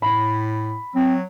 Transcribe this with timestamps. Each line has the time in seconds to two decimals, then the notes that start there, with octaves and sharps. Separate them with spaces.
0.02 A2 B5
0.95 F#3 C4